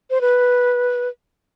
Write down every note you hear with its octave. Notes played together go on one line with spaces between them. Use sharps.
C5
B4